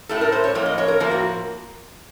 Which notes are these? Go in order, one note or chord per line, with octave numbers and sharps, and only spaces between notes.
A2 A3 A4
A#4
C5
C#5
A2 F3 A#3 C#5
D#5
C#5
A#4
A2 F3 A#3 A#4
F#4